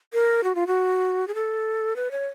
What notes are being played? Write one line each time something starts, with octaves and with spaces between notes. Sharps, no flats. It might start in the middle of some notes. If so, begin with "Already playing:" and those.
A#4
F#4
F4
F#4
G#4
A4
B4
C#5